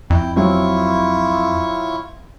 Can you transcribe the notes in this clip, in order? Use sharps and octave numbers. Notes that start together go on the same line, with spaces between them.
F2 E4 G5
F#3 C4 E4 F4 C#6